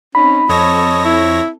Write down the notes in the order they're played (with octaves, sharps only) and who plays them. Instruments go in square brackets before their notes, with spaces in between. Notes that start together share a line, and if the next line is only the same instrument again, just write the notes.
[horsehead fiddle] C4 D#4 [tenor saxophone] C#4 [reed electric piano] B5
[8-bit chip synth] F2 C#5 A#6 [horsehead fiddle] C4 A4 [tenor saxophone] D#5
[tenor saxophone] E4